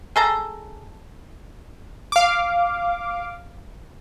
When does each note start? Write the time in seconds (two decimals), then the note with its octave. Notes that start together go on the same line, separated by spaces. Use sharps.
0.16 G#4 A4 A#5
2.12 F5 D6